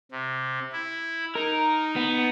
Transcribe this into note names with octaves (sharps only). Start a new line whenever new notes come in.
C3
E4
D#4 A#4
B3